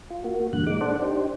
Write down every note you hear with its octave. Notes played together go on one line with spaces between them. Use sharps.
F4
A#3 F#4
E2 G2 A#2 D3 F#6
G2 A#2 G#3 D#4 D6
D4 A4 C5 D5 F#5
D4 D#4 G4 C5